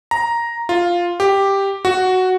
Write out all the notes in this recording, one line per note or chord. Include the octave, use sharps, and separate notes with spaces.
A#5
F4
G4
F#4